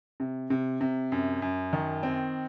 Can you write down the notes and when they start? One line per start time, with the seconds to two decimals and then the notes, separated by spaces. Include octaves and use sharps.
0.20 C3
0.50 C3
0.81 C3
1.12 F#2
1.42 F#2
1.73 D#3
2.03 C4